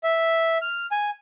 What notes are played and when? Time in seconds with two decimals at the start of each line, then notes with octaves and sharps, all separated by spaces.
0.03 E5
0.62 F6
0.91 G#5